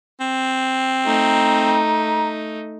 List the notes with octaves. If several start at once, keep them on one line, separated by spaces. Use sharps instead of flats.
C4
A3 D#4 A#5